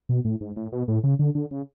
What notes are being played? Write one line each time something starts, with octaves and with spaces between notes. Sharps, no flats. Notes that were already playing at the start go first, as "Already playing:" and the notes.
B2
A2
G#2
A2
B2
A2
C#3
D3
D3
C#3